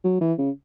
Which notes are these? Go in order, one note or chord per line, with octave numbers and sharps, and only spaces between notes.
F#3
E3
C#3